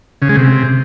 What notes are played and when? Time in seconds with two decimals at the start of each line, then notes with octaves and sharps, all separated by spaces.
0.22 C#3
0.29 G#3
0.37 C3